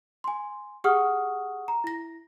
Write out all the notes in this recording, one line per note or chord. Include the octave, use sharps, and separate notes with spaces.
G#5 C6
G4 G#4 F#5 C#6 D#6 F6
A#5
E4 A#6